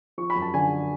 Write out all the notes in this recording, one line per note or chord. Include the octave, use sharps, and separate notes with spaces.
F3 C#6
B5
F#2
A5
D3 G#5